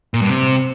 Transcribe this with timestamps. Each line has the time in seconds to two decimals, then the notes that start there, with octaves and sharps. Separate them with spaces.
0.14 A#2
0.22 G2
0.29 C3